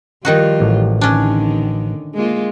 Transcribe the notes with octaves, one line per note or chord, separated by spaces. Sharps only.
D#3 F3 G3 D#4 F4 F#4
A1
D3 D#3 C#4 D4
G#3 A#3 F4